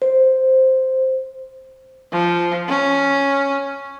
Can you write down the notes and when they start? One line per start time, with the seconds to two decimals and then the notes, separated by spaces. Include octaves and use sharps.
0.02 C5
2.12 F3
2.69 C#4